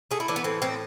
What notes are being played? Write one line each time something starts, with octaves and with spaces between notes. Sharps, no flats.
A3 G#4
E4
E3 D4
B3
A2 C4
A2 C4